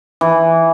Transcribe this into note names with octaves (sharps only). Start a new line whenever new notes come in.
E3